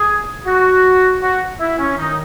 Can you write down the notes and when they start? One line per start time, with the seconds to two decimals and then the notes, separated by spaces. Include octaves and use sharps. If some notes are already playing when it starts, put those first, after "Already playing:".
Already playing: G#4
0.46 F#4
1.22 F#4
1.60 E4
1.78 C#4
1.97 D#3 D#4